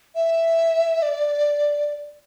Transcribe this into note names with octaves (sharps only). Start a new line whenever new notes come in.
E5
D5